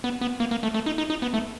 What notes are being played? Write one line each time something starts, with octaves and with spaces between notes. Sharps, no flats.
B3
B3
A#3
A#3
A3
A3
D#4
D#4
D#4
B3
A3